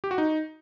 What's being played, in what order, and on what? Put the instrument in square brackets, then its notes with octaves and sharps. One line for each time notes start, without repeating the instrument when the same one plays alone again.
[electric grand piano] G4
F#4
D#4